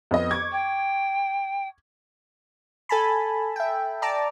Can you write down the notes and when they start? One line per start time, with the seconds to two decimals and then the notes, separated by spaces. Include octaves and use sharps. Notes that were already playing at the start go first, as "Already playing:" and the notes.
0.11 F2 B3 D#5
0.31 C#6 D6 G#6
0.52 G5
2.89 A4 G#5 A5 B5
3.56 E5 G5
4.02 D5 A5 A#5 D6